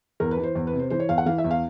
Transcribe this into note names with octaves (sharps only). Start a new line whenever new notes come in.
E2 A#4
B4
E3
C5
E2
B4
C3
C5
E3 C5
C#5
E2 F5
F#5
E3 F5
E5
E2
F5